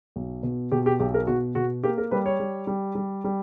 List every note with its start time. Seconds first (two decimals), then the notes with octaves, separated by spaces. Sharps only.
0.16 B1
0.43 B2
0.72 B2 G4
0.86 G4
1.00 B1 G4
1.14 A#4
1.27 B2 F#4
1.55 B2 F#4
1.84 A#3 G4
1.98 A#4
2.11 G3 B4
2.26 C#5
2.40 G3
2.67 G3
2.95 G3
3.24 G3